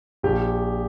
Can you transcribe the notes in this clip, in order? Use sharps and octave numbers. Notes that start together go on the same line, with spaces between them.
A#1 G4